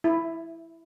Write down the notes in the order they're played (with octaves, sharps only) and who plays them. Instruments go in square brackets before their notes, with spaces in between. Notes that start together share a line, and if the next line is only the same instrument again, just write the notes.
[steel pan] E4